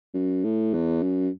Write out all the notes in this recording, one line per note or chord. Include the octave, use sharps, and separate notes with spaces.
F#2
A2
E2
F#2